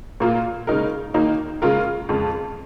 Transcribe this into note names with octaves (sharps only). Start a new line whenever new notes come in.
A#2 A#3 F4
C#3 G#3 D#4 A#4
D#3 A#3 D#4
C#3 G#3 F4 A#4
F2 C#3 G#3